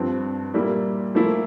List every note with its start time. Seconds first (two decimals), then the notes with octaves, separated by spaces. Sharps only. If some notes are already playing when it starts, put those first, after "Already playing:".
Already playing: G2 F3 C4
0.54 A#2 G3 A#3 E4
1.15 A2 F3 A#3 E4